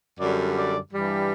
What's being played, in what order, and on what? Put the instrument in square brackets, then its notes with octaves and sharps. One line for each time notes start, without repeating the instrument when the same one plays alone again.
[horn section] F#2 D3 G3 D5
D5
G2 E3 G3